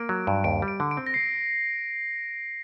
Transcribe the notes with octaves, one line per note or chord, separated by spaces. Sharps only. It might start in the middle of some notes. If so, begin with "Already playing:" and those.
Already playing: A#3 D7
F#3
G2
D#2 D7
G3
D7
D3
D7
C4
A#6
C7